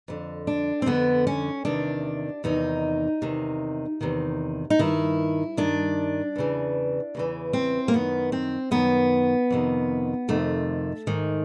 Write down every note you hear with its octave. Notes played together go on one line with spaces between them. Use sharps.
F2 D3
D4
C4
F2 D3 B3
C#4
E2 C3 D#3 D4
E2 C3 D#3 D#4
E2 C3 D#3
E2 C3 D#3
D#4
G2 D#3 E4
G2 D#3 D4
E2 C#3 E3
E2 C#3 E3
C4
A#3
F#2 D#3 B3
C4
F#2 D#3 B3
F2 C3 D#3
F2 C3 D#3 A3
G#2 D#3